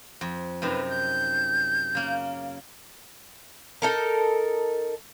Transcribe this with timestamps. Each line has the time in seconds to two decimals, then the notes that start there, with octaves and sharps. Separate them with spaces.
0.21 F2
0.62 F#2 C3 D#4 B4
0.89 G6
1.95 C#3 A#3
3.82 D#4 A4 A#4